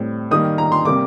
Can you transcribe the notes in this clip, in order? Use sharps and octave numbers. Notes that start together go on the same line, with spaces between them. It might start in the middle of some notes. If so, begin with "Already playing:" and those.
Already playing: A2 G3 C4
D#3 G3 A#3 D#6
A#5
C6
C3 G3 A#3 D6